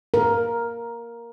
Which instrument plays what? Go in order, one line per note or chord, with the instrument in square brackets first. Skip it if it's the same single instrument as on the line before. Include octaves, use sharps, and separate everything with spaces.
[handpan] A#4